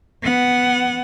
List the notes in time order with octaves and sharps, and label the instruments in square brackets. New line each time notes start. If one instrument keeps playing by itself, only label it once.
[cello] B3 F#5